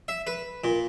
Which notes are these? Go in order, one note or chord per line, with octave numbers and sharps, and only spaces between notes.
E5
B4
A#2